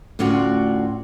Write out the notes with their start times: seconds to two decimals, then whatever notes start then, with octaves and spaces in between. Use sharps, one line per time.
0.19 D2 A2 C#4 F4 F#4 D5